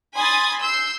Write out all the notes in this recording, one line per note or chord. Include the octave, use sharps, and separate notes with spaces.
G#5 B5 C6 D#6 G#6 A6
E6 G6 C7